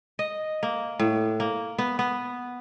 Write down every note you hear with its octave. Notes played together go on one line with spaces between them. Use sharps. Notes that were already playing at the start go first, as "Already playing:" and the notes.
D#5
A#3
A2
A#3
B3
B3